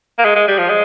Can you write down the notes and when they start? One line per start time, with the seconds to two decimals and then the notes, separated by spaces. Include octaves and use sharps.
0.18 A#3
0.24 G#3
0.36 G#3
0.48 G3
0.58 F3
0.70 G#3